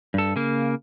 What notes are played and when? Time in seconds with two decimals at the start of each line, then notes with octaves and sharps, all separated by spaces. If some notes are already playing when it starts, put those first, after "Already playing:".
0.14 G2 A4
0.36 C#3 A#3